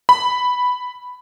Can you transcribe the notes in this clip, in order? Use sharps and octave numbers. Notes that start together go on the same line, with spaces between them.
B5